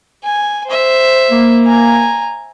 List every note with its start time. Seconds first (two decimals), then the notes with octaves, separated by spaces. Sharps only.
0.24 G#5
0.68 C5 E5
1.31 A#3
1.65 G#5 A#5